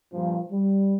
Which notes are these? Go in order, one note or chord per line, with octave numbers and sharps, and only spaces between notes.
G2 A#2 F3
G3